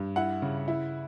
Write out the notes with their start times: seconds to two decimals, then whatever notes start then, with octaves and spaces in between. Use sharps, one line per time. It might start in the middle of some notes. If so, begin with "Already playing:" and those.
Already playing: G2
0.16 E4 F#5
0.42 C#3
0.68 E4